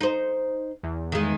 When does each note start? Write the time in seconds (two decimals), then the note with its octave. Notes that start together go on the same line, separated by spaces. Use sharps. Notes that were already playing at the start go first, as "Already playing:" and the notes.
0.01 D#4 C5
0.84 E2
1.12 D#3 G#3